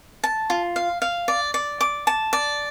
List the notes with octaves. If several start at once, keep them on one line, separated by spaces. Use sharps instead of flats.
A5
F4
F5
F5
D5
D5
D6
A5
D5